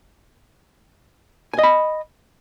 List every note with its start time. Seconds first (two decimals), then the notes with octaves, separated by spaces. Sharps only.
1.54 G#5
1.59 D#5
1.63 B5